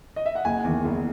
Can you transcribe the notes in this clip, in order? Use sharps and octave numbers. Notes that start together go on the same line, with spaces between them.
D#5
E5
F#5
F#1 G#5
E2 D#3
F#1